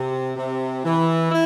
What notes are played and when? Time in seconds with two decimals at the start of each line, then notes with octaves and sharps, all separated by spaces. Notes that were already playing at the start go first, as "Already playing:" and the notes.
Already playing: C3
0.37 C3
0.84 E3
1.31 E4